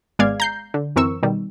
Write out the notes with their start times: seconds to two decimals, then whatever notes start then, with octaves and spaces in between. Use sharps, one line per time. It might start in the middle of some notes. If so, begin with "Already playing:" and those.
0.19 G#1 G#3 B3 D5 F5 G#6
0.40 A#5 G6 C7
0.74 D3
0.96 F#2 E3 C4 A#4 C#6 E6
1.23 B2 D#3 G3